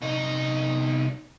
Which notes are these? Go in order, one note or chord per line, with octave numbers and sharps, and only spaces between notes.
C2 D#4